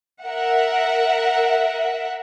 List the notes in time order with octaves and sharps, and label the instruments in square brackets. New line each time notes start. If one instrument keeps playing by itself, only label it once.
[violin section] A#4 E5 F#5